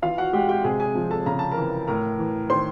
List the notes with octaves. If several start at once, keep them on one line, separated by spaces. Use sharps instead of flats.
E3 F4 F5
F#4 F#5
G#3 G4 G5
G4 G5
C3 G#4 G#5
G#4 G#5
F3
A4 A5
C#3 A#5
A5
A#4 A#5
E3
A2 A#4 A#5
E3
D#3 C5 C6